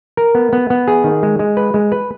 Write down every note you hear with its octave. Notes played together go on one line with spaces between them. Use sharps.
A#4
B3
B3
B3
G#4
D#3
G#3
G#3
B4
G#3
B4